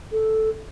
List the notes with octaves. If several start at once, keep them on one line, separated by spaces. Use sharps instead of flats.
A4